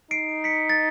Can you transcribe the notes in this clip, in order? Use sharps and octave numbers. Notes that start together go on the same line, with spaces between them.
D#4 C7 D7
B6 C#7
A6